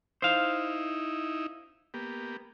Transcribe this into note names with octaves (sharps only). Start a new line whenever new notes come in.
D#4 E4 C5 F5
A#3 B3 G4